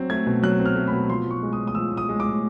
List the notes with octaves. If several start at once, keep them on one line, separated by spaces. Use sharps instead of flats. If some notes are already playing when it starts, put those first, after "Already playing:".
Already playing: F#3 C4
A3 G#6
B2
F#3 F#6
C4
F6
A3
B5
B2
F3 C6
A2 C#6
G#3
D#6
A2
D#6
F3 E6
A2
D#6
G#3
D6
A2